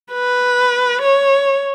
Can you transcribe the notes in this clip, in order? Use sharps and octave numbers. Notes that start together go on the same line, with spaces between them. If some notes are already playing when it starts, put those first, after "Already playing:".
B4
C#5